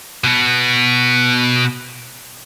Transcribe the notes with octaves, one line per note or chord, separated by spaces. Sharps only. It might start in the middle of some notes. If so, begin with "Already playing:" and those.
B2 B3